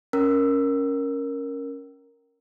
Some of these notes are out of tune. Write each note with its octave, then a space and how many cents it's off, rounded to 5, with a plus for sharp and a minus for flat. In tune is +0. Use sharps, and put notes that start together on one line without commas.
C#4 +0 A#4 +0 E6 +15